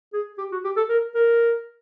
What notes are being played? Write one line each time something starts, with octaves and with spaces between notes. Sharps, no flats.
G#4
G4
F#4
G4
A4
A#4
A#4